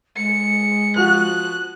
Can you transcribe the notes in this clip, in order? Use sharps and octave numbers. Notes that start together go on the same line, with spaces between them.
G#3 C#7
F3 F#4 F#6